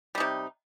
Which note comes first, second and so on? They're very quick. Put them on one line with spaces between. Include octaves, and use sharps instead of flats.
G3 D#4 C3